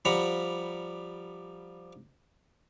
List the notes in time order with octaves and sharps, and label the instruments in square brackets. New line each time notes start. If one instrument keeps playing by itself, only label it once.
[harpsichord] F3 G3 F#5 A#5 B5